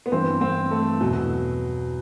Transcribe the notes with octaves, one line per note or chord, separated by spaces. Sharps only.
B3
G2 E3 C4
C4
A3
E2 B2 F#3